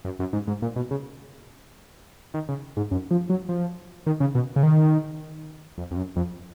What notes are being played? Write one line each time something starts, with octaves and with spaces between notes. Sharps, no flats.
F#2
F#2
G#2
G#2
A#2
B2
C#3
D#3
C#3
G#2
F#2
F3
F#3
F3
D#3
C#3
B2
C#3
D#3
F2
F2
F#2
F2